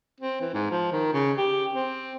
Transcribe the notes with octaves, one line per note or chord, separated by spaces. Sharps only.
C4
E3
G#2
F3
D#3
C#3
G4
C4